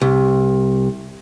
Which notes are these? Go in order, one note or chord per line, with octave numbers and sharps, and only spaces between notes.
C2